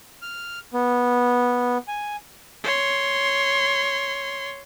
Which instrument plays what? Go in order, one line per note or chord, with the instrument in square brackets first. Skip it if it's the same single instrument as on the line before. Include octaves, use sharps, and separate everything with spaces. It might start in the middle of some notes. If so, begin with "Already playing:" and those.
[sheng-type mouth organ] F6
B3
G#5
[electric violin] C#5 C6